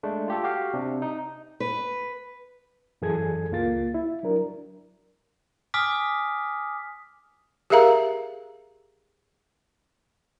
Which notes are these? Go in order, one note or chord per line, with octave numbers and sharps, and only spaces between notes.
G#3 A3 D4
F4 G4 A4
F#4 G4 F5 G5
C3 D4
D#4
B4
F#2 E3 G#4 A4 G#6
C#2 A#3 F4 A6
E4
F#3 D4 A#4
G#5 D6 D#6 F6 B6
G4 G#4 A#4 E5 F5 A#5